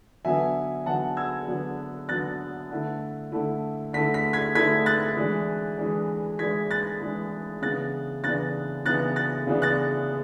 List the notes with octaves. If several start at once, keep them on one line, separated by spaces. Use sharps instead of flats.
D3 F#3 B3 D4 E5 G#5
D3 F#3 B3 D4 F#5 A5
E6 G#6
D3 F#3 B3 D4
D3 F#3 B3 D4 F#6 A6
D3 A3 E4
D3 A3 E4
D3 A3 E4 B6
B6
G#6 B6
D3 A3 E4 G#6 B6
F#6 A6
E3 G#3 D4
E3 G#3 D4
E3 G#3 D4 G#6 B6
F#6 A6
E3 G#3 D4
C#3 E3 B3 D4 F#6 A6
C#3 E3 B3 D4 F#6 A6
C#3 E3 B3 D4 F#6 A6
F#6 A6
C#3 E3 B3 D4
F#6 A6